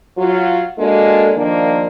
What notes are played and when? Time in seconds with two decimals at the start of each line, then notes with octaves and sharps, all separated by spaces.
0.18 F#3 F4
0.78 G#3 A#3 D4 F#4 A4
1.37 D#3 F3 A#3 D4